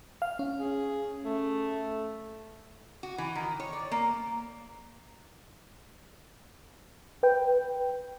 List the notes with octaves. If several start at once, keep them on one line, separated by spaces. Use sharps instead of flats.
F5
C#4
G#4
A3
F#4
E3
D#3
C#5
D5
A#3
B4 G5